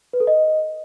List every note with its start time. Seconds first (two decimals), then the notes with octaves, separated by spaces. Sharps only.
0.13 B4
0.20 A4
0.27 D#5